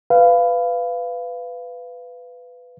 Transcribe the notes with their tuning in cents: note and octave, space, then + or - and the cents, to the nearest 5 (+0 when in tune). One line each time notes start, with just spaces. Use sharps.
B4 +15 F5 -15